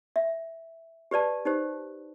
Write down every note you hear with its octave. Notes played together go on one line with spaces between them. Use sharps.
E5
G4 B4 D5 A5
D#4 G4 C5